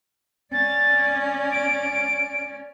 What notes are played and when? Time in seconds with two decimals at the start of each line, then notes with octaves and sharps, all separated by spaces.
0.53 C#4 D5 A6
1.52 D7